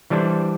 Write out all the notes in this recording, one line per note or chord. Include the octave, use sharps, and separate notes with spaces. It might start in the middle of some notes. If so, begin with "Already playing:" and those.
E3 G3 D4 A4 C5